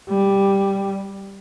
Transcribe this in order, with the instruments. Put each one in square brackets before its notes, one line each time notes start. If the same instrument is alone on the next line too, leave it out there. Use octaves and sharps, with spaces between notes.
[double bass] G3